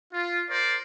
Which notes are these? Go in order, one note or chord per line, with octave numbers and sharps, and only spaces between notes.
F4
A#4 C5 D5